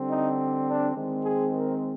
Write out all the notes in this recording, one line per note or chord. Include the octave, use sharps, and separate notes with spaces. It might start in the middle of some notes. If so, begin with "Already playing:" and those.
Already playing: D3 G3 C4
D#4
D4
D#3 G#3 C4
G#4
A#4